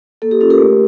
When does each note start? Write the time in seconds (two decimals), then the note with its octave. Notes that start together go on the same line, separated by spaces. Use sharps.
0.22 A#3 A4
0.31 G4
0.41 C#4 F4 A4
0.50 G4 A#4
0.60 A3